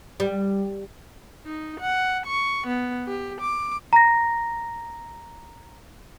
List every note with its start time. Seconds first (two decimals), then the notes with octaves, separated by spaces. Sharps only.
0.20 G3
1.46 D#4
1.80 F#5
2.26 C#6
2.67 B3
3.07 G4
3.41 D6
3.93 A#5 A#6